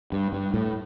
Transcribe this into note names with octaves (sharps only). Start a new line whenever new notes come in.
G2
G2
A2